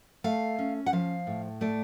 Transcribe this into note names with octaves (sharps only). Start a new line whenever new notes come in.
A3 F5
C#4
F#5
F3 F5
A2
A3 D5